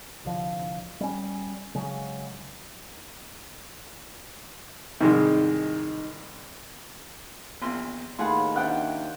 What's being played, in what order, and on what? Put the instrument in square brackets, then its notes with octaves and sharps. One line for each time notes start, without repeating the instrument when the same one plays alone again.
[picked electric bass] C2 D3 F3
G3 C#4
C#3 F#3 G#3
[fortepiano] C2 G#2 G#3 [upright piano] D#3
[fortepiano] A#1 E2 C6 [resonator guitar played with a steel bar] A#2 C4
[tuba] D#2 [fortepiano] A2 G#4 F#5 [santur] F4 C6 [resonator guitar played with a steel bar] B4
[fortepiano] C#4 D4 E4 [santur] F#5 G5